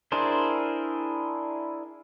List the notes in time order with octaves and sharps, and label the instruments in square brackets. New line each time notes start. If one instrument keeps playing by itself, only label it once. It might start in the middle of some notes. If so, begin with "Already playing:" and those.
[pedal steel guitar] D4 E4 G#4 A#4 C5